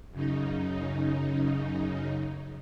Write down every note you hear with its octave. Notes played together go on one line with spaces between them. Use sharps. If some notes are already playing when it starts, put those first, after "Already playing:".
F#2 C#3 D#4